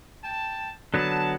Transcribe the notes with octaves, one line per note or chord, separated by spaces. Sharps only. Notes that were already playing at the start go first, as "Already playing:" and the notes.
G5 A5
D3 F#3 B3 A5